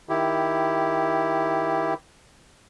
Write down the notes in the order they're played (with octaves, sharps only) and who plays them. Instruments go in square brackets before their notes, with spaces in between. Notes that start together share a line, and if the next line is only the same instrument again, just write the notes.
[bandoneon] D#3 E4 G4